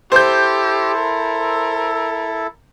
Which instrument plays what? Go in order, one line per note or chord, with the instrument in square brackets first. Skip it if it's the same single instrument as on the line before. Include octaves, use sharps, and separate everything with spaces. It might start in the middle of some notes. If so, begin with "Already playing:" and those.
[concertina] E4 A4 [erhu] G4 [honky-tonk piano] C5 G6
[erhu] A#4